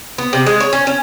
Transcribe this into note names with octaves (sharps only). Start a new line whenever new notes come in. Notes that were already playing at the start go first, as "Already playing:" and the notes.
B3
C3
G#3
C#5
C#4
C#4